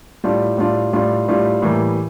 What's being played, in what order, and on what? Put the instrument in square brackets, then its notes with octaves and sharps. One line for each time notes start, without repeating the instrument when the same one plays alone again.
[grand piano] A2 G3 D4 F4
A2 G3 D4 F4
A2 G3 D4 F4
A2 G3 D4 F4
A2 E3 G3 A#3